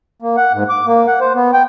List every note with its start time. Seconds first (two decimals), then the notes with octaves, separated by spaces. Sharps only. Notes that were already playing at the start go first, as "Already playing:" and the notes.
0.22 A#3
0.37 F#5
0.53 G#2
0.70 D6
0.86 A#3
1.08 F#5
1.21 C5
1.35 B3
1.53 G5